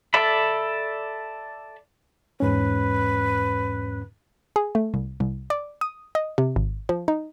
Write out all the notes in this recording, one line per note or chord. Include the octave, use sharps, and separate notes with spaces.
A4 D5 E5 B5
E2 G#2 C#4 B4
G#4
A3
C2
C2
D5
D#6
D#5
C3
G#1
F3
D#4